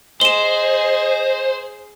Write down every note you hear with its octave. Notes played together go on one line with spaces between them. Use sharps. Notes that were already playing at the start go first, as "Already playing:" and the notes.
G#4 C5 D#5 E7 G7